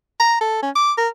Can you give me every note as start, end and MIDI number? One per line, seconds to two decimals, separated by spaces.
0.20 0.39 82
0.41 0.61 69
0.63 0.70 61
0.75 0.93 86
0.98 1.08 70